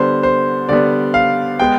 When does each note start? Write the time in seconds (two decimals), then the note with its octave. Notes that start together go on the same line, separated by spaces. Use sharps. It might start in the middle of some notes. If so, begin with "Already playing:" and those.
Already playing: D3 G3 B3 C5
0.23 C5
0.69 D3 G3 B3 D5
1.14 F5
1.60 G#3 B3 G5